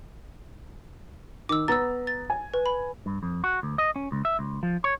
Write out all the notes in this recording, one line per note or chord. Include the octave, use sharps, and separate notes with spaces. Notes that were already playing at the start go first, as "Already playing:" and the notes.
D#3 D6 E6
B3 A#5 E6 A6
A6
G#5
B4
B5
G2
F2
F#4
D2
D#5
C#4
C#2
E5
C#2
F3
C#5